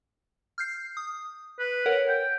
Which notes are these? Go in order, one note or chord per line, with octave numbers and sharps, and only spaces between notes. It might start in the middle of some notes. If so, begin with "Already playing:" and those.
F6 G6 C7
D#6
B4
A#4 C#5 F#5
G5